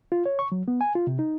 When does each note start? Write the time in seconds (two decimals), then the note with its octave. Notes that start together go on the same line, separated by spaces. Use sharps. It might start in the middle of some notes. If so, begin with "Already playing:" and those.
0.12 F4
0.26 C#5
0.39 C#6
0.52 F#3
0.68 B3
0.81 G#5
0.95 F4
1.07 C3
1.19 D#4